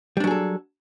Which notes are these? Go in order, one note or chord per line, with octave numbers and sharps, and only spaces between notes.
F#3 G3 D4 G#4 A4